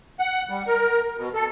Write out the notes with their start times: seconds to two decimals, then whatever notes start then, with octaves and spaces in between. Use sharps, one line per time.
0.20 F#5
0.49 G3
0.67 A#4
1.17 B2
1.35 A4